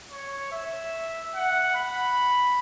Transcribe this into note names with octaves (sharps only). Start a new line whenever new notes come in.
C#5
E5
F#5
B5